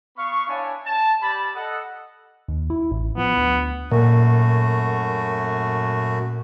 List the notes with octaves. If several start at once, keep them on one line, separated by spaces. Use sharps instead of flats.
B3 F5 B5 C#6
D4 E4 C#5 F5 G#5 A5
A5
G3 A5 B5
A4 D#5 F#5
D#2
E4
A1
F3 B3
D2
F#2 A#2 A3 F#4